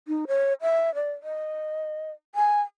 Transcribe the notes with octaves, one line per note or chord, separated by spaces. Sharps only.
D#4
C#5
E5
D5
D#5
G#5